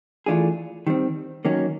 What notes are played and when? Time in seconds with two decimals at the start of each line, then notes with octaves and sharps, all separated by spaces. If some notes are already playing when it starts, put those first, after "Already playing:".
0.26 E3 A3 D4 F4 G#4
0.87 D#3 G3 C4
1.45 D#3 F#3 A#3 C#4